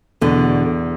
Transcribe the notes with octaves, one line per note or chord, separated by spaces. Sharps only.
E2 B2 D3